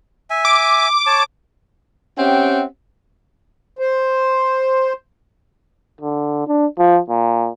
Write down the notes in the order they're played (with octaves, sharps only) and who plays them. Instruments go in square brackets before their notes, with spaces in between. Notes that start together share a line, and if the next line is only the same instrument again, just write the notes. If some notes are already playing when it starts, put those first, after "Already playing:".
[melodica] E5 G#5
[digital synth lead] D6
[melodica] C#5 A5
[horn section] C4 C#4 G4 E5 F#5 G5
[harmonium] C5
[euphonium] D3
D4
F3
A#2